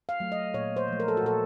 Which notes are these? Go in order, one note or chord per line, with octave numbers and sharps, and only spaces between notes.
F5
F#3 A3
D#5
A#2 C#5
C5
F3 A3
A#4
A4
F#4
A#2 A4